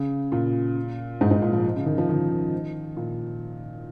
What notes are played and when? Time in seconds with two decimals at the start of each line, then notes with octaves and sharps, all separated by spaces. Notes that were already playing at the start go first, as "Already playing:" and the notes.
Already playing: C#3
0.32 A#2
1.21 G#2
1.31 G#2
1.42 A#2
1.53 F3
1.76 C#3
1.86 D#3
1.98 F3
2.09 D#3
2.97 A#2